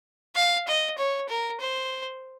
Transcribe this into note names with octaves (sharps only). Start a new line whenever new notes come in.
F5
D#5
C#5
A#4
C5